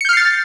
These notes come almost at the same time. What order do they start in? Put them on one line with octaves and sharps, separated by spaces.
C#7 G6 F6 C7 A6